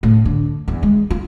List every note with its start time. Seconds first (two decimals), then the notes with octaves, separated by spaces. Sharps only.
0.03 A2
0.25 D3
0.68 E2
0.83 G#3
1.11 F4